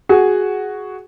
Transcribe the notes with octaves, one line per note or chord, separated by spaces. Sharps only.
F#4 G#4